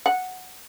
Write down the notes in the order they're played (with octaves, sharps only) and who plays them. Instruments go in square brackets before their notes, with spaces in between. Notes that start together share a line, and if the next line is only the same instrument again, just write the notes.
[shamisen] F#5